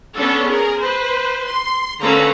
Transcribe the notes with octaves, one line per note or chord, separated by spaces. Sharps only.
B3 C#4 D4 A4
G#4 A#4
B4 C5
C6
D3 A#3 C#4 A4 B4 A#5